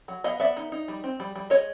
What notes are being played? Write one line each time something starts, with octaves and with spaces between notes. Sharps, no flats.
F#3
B3 D#5 F5
B3 D5 E5
D#4
D#4
G3
C4
G3
G3
G#3 C#5 D#5